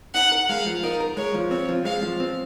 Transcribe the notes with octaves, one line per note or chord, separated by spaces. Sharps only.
D#4 F#5
A#4
G#3 F5
F3
D#4 A#4
A#4
G#3 C#5
F3
C4 C#5
F3
G#3 F5
F3
C4